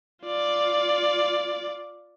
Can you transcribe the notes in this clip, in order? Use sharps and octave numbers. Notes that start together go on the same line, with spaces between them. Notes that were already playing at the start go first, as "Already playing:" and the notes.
F4 D5